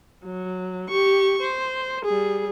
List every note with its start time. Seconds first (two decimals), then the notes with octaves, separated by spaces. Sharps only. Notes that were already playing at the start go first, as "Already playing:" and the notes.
0.25 F#3
0.90 G4 C#6
1.41 C5
2.05 G3 G#4